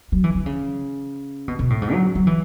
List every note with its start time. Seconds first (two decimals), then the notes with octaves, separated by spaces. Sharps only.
0.12 F#3
0.24 E3
0.35 D3
0.46 C#3
1.48 B2
1.59 B2
1.70 A2
1.82 G#2
1.93 F#3
2.15 F#3
2.27 E3